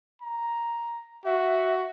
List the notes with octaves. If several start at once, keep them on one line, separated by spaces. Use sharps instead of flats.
A#5
F#4 E5